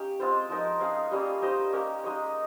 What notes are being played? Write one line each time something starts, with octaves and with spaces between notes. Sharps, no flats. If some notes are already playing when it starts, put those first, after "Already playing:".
Already playing: C#4 D#4 G4 F5
G#3 C4 F4 C5
F3 G#3 D#4 A#4
C#4 G#4 C#5 F5
G3 A#3 C#4 G#4
D#4 G4 C5 D#5
A#3 C#4 G4 A#4
G#3 D#4 G#4 C#5